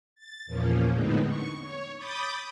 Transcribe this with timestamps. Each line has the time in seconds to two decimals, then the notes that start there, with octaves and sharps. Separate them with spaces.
0.15 A6
0.46 E2 A#2 F3 A#3 C#4
0.91 A2 D3 G#3 B3 C4 D#4
1.26 C#6
1.61 C#5
1.97 B5 D6 D#6 G6 A6